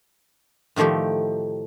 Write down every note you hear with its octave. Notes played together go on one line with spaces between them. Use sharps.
A2 D#3 F3 A3 G4